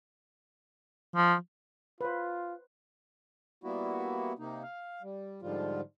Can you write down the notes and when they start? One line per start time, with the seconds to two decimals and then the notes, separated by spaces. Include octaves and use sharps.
1.15 F3
2.01 F4 B4 C5
3.64 G3 A#3 B3 E4 F#4
4.39 C3 A#3 D#4
4.63 F5
5.02 G3
5.42 G#2 D3 F3 G3 F4